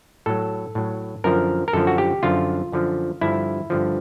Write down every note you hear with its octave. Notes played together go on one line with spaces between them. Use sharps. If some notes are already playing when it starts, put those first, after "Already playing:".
A2 F#3 A4
A2 F#3
F#2 D3 F3 A#4
A#4
F#2 D3 F3 A4
F#4
G4
F#2 D3 F3 F4
F#2 D3 F3
G2 D3 F3 E4
G2 D3 F3